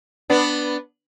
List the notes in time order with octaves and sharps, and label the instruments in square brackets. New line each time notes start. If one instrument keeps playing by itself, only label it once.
[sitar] B3 D4